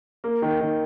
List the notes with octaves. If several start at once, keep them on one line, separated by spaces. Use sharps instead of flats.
A#3
D#3
D#3